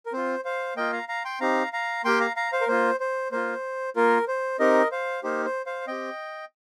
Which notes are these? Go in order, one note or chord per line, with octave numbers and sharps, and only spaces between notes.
A#4
C4 F4 C5
C5 F5
A#3 F4 D#5 G5
F5 A#5
F5 A#5
G5 C6
C4 D#4 G4 F5 A#5
F5 A#5
A#3 G4 G5 C6
F5 A#5
F5 A#5
C5 F5
A#4
A#3 F4 C5
C5
A#3 F4 C5
A#3 F4 A#4
C5
C4 D#4 G4 A#4 D#5
C5 F5
A#3 D#4 G4 C5
C5
C5 F5
C4 G4 D#5 G5